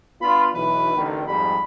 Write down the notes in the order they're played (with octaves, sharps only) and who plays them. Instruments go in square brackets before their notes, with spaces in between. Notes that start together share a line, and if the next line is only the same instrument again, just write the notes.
[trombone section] B3 D4 F4 [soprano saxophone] B5
[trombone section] B1 E3 [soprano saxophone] B4
[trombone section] A1 D3 D#3
[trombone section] F2 G#2 G3 [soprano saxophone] B5